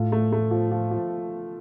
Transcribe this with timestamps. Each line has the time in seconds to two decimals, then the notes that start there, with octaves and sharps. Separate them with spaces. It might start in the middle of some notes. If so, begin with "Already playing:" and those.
Already playing: A2 F4 A4
0.12 A3
0.32 A3
0.51 F3
0.71 F3
0.91 F3